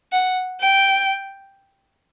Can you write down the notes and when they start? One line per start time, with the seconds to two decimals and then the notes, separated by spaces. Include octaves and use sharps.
0.12 F#5
0.61 G5